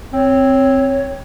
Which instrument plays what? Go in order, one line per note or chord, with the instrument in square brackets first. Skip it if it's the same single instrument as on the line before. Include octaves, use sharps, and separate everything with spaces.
[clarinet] C4 [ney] C#5